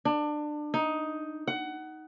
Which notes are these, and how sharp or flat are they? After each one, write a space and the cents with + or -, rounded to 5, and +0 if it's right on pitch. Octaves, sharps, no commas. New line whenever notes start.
D4 +25
D#4 +10
F#5 +20